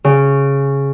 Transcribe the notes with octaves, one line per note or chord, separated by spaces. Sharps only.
C#3